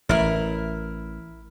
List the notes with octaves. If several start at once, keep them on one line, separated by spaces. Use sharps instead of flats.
A1 E4 A#4